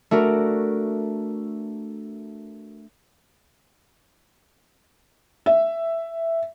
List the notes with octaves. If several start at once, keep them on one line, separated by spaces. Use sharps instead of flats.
A3 D4 F#4 A#4
E5